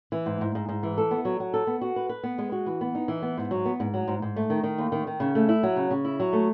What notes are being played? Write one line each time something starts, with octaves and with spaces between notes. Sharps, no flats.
E3
G#2
G#2
G#2
G#2
E3
A4
B3
F#3
F#3
A4
B3
F#4
B4
B4
B3
G#3
F#4
E3
B3
D#4
E3
B3
G#2
F#3
B3
G#2
F#3
G#2
G#2
A3
D#3
D#3
D#2
D#3
D#3
C#3
A3
E4
F#3
C#3
C#3
E4
F#3
A3